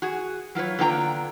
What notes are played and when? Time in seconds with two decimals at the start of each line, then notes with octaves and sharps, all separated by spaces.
0.02 F#4 G#4
0.55 F#3 F4 B4 C#5
0.79 D3 A#3 B3 F4 G5 A#5